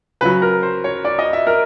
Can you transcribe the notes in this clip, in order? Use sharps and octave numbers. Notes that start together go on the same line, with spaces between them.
C#3 F#3 B4
A#4
C5
C#5
D5
D#5
E5
A#4